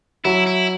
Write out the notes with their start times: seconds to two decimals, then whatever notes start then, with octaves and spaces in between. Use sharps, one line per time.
0.25 F#3 E4
0.47 E4